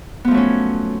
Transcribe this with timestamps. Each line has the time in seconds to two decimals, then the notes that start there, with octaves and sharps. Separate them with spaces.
0.25 B3
0.28 F3
0.31 A3
0.34 F#3
0.37 C#4